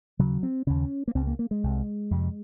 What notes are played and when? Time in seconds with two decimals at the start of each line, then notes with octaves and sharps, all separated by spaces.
0.19 D#2 C#3 F#3
0.43 C4
0.67 D#2 C#3 C#4
1.08 A#3
1.15 C#2 C#3 C4
1.27 A#3
1.39 A#3
1.51 G#3
1.64 C2 C3
2.11 F2 C3